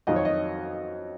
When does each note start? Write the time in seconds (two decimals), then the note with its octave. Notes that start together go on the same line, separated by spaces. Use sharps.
0.07 F2 D#3 F#3 D#5
0.16 C#5
0.25 D#5